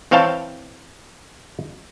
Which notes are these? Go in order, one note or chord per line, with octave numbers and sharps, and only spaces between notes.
E3 C4 C#5 F5 G5 A5